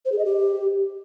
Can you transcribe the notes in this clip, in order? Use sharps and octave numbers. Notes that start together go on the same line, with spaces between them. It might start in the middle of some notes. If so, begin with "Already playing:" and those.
C5
G#4
D#5
G4